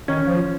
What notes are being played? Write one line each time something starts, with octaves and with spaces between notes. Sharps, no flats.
D#3 C#4
F3